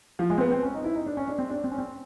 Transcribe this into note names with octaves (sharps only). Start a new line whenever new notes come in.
F3
G#3
C4
B3
C4
C#4
D#4
E4
D#4
D4
C#4
D4
C4
D4
C4
C#4
C4